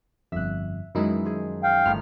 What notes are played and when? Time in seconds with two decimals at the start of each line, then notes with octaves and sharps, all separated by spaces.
0.32 G1 F2 E5 F#6
0.95 F#2 D#3 E3 G#3 D#4 E4
1.25 F3 G#4
1.64 F5 G5
1.86 G1 A2 D#3 F3 F6